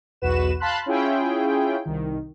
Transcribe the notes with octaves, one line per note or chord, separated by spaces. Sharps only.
B1 E2 F#4 B4 E7
F5 A5 B5 C6 F#6
C#4 E4 F4 G#4 G5
C2 D#3